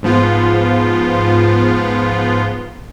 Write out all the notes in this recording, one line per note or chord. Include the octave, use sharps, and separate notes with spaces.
G#2 F3 B3 F4